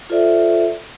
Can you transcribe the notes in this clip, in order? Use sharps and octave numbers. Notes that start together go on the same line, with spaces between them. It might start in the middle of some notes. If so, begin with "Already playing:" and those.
F4 A4 C5 D5 E5